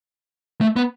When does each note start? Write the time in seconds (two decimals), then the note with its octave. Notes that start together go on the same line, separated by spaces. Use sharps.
0.61 A3
0.76 B3